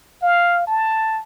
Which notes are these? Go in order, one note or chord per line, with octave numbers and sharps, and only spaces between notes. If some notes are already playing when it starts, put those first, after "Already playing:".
F5
A5